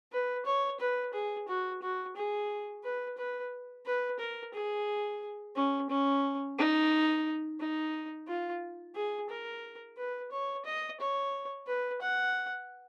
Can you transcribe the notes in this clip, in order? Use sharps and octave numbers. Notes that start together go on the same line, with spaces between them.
B4
C#5
B4
G#4
F#4
F#4
G#4
B4
B4
B4
A#4
G#4
C#4
C#4
D#4
D#4
F4
G#4
A#4
B4
C#5
D#5
C#5
B4
F#5